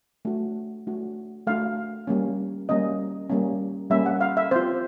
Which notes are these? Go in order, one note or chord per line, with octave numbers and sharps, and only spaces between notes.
A3 D4 F#4
A3 D4 F#4
A3 D4 F#4 F5
G3 A#3 C#4
G3 A#3 C#4 D#5
G3 A#3 C#4
G3 A#3 C#4 E5
F#5
F5
E5
C4 F4 C5